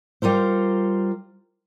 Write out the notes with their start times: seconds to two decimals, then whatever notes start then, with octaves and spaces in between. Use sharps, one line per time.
0.22 G3 F4 A#4 C5